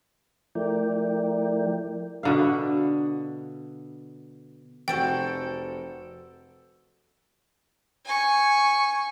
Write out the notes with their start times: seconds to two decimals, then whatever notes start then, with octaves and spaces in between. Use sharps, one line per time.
0.55 F3 A3 E4 A#4 D5 G5
2.23 B2 D3 F5
4.88 F1 F#4 A4 C5 D5 G5
8.05 G#5 C#6